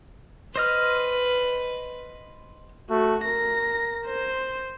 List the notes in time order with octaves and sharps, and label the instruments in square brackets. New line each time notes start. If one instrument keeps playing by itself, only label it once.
[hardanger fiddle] B4 [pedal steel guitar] C5 D#5 F6
[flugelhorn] A3 [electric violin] F#4
[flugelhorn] A#4 [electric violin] A#6
[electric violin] C5